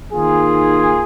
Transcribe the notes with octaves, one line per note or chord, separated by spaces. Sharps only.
D#2 D#3 A#3 D#4 F4 G#4